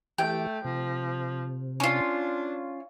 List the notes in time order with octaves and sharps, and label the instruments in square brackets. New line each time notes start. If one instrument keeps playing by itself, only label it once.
[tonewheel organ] E3 G4 [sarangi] A3 [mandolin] G5
[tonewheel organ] C3 [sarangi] F3
[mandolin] C#4 F4 [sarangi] D4